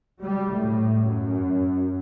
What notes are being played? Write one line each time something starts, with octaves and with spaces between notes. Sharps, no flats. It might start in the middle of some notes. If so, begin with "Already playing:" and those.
G3
A2
F#2